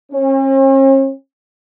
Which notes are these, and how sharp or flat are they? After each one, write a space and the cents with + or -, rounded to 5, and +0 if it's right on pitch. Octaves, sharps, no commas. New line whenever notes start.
C#4 -45